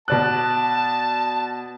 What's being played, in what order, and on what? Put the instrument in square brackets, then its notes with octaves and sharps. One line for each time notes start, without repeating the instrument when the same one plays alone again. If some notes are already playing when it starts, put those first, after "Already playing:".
[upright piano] B2 D5 F#6 [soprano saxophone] A5